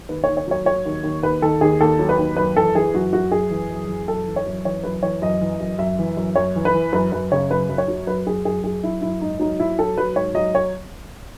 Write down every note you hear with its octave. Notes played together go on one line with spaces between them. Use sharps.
D#2 B4
C#5
D#2
C#5
F#3 C#5
F#3 C#5
D#2
D#2
D#2 B4
D#3 A4
D#2 G#4
D#2 A4
F#3
B4
D#2
F#2 B4
E3 A4
E3 G#4
F#2 F#4
F#2 F#4
F#2 G#4
E3
F#2
E3
F#2 A4
E3
C#5
F#2
E3 C#5
F#2 B4
E3 C#5
F#2 D#5
E3
F#2
F#2 E5
E3
F#2
F#2 C#5
E3
B4
E3
F#2 B4
F#2 B4
C#3 C#5
F#2 B4
F#2
C#5
F#3
F#2 B4
F#2 G#4
F#2 G#4
F#2 G#4
F#2 E4
F#2 E4
G#2 D#4
F#3 D#4
F#3 E4
F#3 A4
F#3 B4
G#2 C#5
F#3 D#5
C#5